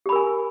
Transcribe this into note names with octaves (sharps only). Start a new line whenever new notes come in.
G4 A#4 G#5 B5